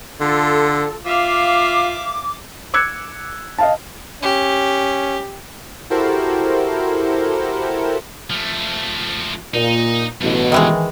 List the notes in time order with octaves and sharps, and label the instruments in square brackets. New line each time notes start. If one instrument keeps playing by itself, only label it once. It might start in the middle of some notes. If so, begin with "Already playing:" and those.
[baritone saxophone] D3 [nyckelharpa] F4 [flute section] A4
[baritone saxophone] F4 [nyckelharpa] E5 F5 [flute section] D6
[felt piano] D6 E6 F#6 G#6 C#7
D#5 F5 A5
[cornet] C#4 [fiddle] G4
[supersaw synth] E4 F#4 G4 A4 A#4 C5
[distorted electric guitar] F3 A3
[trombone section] A#2 [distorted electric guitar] D#4
[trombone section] A1 B2 [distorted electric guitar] G2 D3
[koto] D#3 E3 G#3